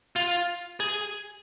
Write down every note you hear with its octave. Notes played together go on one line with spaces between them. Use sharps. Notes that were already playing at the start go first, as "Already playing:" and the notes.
F4
G#4